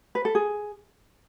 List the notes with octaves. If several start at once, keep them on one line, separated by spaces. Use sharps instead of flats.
B4
A4
G#4